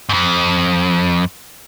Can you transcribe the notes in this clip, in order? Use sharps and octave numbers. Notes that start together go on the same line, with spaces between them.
F2 G#2